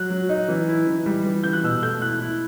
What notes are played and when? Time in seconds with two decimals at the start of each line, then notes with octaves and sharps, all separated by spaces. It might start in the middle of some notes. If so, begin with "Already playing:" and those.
Already playing: F#3 F#6
0.10 F#3
0.29 D#4
0.48 E3
0.68 E4
0.87 E3
1.06 G3
1.25 E3
1.43 E3 G6
1.53 F#6
1.63 B2 E6
1.82 A3 G6
2.02 E4 F#6
2.21 E4